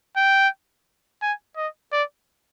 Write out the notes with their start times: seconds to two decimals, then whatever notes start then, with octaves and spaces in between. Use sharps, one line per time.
0.17 G5
1.22 G#5
1.57 D#5
1.92 D5